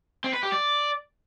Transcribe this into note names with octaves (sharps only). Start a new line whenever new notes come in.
C4
B4
G4
D5